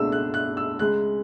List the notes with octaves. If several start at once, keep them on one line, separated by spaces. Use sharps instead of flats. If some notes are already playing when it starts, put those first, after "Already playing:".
Already playing: C#2 B2 A3 D4 E6
F#6
F#6
E6
C#2 C#3 G#3 F#6